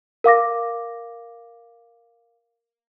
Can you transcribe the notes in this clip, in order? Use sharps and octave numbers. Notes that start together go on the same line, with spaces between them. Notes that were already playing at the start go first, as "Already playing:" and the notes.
A#4 F5 D6 A#6